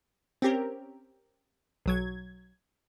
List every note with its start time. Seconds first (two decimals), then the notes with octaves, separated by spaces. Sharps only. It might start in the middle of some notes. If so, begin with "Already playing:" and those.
0.42 C4 C#4 G4 A#4
1.86 B1 F#3 G#6